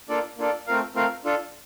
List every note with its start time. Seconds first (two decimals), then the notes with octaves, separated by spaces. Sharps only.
0.09 A#3 D4 F4 A4 D5
0.38 A#3 D4 F4 A4 D5
0.67 A3 C4 F4 A#4 F5
0.95 A3 C4 F4 A#4 F5
1.24 D4 F4 A4